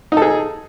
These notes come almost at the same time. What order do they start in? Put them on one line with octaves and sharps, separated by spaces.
D#4 A4 G#4